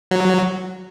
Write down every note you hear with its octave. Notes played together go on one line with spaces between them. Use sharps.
F#3